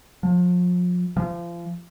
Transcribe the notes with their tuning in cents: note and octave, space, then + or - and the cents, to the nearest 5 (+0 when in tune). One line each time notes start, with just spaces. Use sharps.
F3 +35
F3 -30